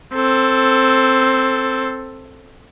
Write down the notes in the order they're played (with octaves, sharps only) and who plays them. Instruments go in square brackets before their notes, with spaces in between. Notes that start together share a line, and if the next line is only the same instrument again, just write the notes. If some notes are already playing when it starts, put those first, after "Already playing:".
[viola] C4 A4